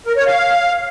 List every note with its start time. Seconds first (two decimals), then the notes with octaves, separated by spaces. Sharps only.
0.06 A#4
0.16 C#5
0.27 F5